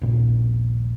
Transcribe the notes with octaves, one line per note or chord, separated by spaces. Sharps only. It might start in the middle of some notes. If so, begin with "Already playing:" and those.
D#1 A#1